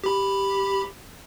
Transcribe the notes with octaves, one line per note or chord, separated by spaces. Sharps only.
G4 B5